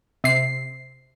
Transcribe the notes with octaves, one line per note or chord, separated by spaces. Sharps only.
C3 C7